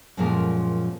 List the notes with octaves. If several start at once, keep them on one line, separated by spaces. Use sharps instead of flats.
F#2 A#2 F3 G#3 A#4